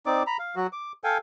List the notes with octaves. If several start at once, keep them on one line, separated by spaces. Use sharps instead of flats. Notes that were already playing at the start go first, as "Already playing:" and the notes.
C4 D#4 D5 D6
A#5 B5
F5
F#3 F#4
D6
A4 F5 G5 G#5